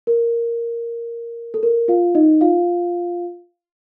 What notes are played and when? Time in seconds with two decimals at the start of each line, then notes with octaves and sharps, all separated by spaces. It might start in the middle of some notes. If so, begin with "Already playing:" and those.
0.07 A#4
1.54 A4
1.63 A#4
1.88 F4 F5
2.15 D#4 D#5
2.41 F4 F5